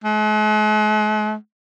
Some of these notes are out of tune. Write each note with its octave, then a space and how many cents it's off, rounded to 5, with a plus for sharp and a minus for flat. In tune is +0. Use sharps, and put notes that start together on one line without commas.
G#3 +45